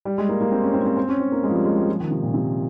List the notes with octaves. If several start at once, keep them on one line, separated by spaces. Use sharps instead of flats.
G3
G#3
A#3
A#3
C4
C#4
C4
A#3
C4
C4
C#4
C4
A#3
G#3
F3
G3
G#3
G3
F3
D#3
C3
A#2
C3